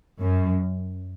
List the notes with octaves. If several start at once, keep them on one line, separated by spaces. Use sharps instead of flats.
F#2